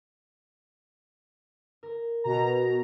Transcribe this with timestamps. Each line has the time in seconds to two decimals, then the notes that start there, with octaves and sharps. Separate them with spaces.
1.83 A#4
2.24 B2 A#5